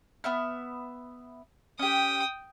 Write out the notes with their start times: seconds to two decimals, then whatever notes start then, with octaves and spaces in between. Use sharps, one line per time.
0.24 B3 E5 F6
1.79 C#4 G4 G5 D#6